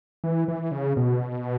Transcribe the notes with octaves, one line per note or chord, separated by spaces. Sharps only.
E3
E3
C#3
B2